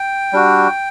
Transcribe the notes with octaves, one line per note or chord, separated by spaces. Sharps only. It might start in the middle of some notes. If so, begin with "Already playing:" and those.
Already playing: G5
G3 D4 F#4